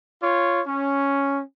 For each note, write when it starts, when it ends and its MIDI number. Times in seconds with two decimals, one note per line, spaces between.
0.22 0.60 65
0.22 0.60 73
0.66 1.41 61